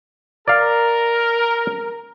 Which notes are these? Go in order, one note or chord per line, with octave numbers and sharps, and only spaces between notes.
A#4 D5 F5